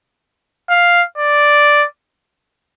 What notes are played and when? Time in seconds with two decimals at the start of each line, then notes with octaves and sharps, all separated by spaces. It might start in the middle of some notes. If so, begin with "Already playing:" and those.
0.70 F5
1.18 D5